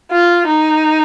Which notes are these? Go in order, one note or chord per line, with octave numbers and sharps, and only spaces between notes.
F4
D#4